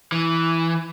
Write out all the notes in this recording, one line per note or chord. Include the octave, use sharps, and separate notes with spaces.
E3